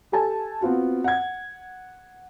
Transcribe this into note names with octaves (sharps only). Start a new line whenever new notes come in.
G4 A4 G#5 A5
B3 C4 F4 F#4
F#5 G#6